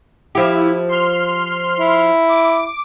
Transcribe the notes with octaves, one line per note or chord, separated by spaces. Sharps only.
F3 E4 G4
C6 F6
E4
D6